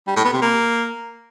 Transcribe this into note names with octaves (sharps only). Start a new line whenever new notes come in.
G3
A2
B3
C3
A#3